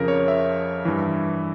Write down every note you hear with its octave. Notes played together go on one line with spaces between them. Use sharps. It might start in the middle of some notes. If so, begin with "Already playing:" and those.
Already playing: F2 C#3 F3 A#4
C#5
E5
G2 E3